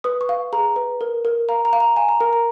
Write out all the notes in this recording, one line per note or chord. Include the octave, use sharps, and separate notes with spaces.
B4 D#6
C#6
F5
G#4 A#5
B4
A#4
A#4
F5 A#5
A#5
F5
A#5
F5 G#5
A#5
A#4 A#5
A#5